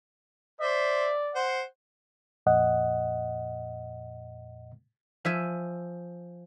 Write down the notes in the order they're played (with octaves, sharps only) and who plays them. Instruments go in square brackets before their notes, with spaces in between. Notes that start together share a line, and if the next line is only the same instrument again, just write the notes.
[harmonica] C5 E5 [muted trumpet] D5
[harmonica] C5 F#5
[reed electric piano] F2 A#2 D#5 F#5
[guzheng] F3 E5 G#5